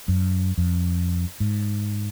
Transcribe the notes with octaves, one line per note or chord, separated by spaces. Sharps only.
F#2
F2
G#2